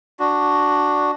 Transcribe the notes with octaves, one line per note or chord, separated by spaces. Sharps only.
D4 F#4